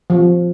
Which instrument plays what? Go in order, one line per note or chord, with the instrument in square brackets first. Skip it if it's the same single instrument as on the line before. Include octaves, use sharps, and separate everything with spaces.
[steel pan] F3